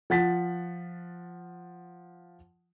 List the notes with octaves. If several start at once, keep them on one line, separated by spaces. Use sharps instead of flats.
F3 F#5 A6 B6